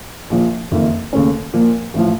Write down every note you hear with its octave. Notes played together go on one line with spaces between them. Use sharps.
A#1 A#2 F3
F#1 F2 D#3 A#3
D#2 C#3 A3 C#4
A#2 F3 A#3
A1 A2 F3